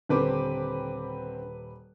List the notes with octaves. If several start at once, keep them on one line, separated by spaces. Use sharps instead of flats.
D#1 D3 C4 G4 B4 D6